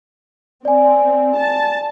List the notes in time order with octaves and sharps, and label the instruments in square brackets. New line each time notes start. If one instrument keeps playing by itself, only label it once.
[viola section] C4 [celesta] D5 G#5
[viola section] A5